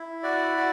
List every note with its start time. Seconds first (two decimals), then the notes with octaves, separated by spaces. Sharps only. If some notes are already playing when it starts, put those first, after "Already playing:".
Already playing: E4
0.23 F#4 D5
0.57 F#4